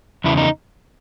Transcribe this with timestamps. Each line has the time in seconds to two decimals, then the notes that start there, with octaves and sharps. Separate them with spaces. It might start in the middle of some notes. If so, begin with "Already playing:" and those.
0.24 E2 C#3 E4
0.37 D#4